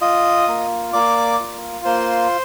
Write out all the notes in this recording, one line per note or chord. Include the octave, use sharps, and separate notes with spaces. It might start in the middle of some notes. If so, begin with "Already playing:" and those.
F4 D#5 D#6
A#3
A#3 D5 D6
F4
A#3 C5 C6